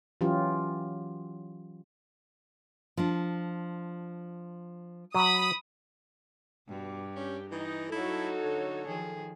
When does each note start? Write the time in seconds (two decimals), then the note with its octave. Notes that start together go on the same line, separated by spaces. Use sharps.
0.21 E3 F#3 C#4 F4 G4
2.97 F3 D4
5.15 F#3 B5 D#6
6.69 G2 B2
7.16 C#4 G4
7.52 E3 D#4
7.92 F#3 D#4 E4 F#4 A4 C#5
8.45 D3
8.87 D#3 F3 G#4